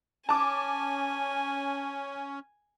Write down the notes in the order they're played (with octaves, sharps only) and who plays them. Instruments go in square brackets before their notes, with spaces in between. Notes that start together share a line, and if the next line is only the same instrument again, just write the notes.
[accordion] C#4 [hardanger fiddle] G#5 [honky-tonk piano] A5 D6